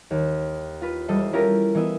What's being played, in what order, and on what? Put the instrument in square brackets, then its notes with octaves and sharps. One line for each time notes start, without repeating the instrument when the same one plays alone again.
[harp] D#2
F4 B4
E1 G3 A4 D#5 E5 C7
C#4 E4 F4 G4 A4 A#4
E3 B3 D#5 E5